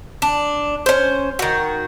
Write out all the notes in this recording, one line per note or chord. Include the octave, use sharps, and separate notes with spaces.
D4
C#4 C5
D#3 F#4